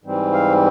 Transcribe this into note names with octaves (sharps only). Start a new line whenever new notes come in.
G#2 E3 G3 C4
F5